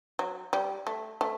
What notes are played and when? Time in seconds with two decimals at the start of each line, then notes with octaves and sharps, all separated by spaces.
0.19 F#3
0.53 G3
0.87 A3
1.21 A3